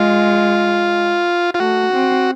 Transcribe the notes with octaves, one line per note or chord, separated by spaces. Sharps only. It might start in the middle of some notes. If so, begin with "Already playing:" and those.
Already playing: G#3 F4
F4
A3 F#4
C4